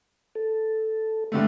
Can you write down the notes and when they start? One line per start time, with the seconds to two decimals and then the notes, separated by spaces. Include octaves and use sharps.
0.35 A4
1.32 G2 D3 A3